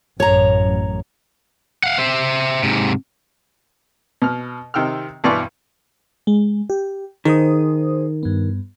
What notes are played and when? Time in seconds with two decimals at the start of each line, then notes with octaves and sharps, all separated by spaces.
0.20 A1 F#2 C#5 A#5
1.84 F5 F#5
1.98 C5 E5
2.63 G#2 C3
4.22 B2 F6
4.74 C3 D#3 G5 E6 F6
5.24 G2 B2 E3 D5 C6 C#6
6.27 G#3
6.70 G4
7.25 D#3 G#4 C5 D#6
8.23 G2 B3